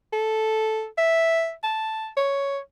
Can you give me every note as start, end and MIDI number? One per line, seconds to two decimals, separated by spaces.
0.13 0.86 69
0.98 1.52 76
1.64 2.09 81
2.17 2.59 73